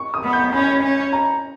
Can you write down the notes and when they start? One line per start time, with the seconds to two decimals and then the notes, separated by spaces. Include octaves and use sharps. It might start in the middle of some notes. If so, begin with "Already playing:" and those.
Already playing: C#6
0.14 D#6
0.24 B3
0.33 G6
0.52 C#4 B5
0.83 C#4
1.13 A#5